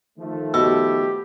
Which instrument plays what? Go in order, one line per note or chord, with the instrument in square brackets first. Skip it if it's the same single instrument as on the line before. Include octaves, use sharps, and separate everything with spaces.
[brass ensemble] D#3 F3 A3
[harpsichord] B2 [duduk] G4 [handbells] E6